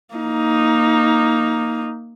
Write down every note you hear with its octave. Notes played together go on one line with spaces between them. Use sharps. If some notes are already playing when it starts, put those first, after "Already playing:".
A#3 D#4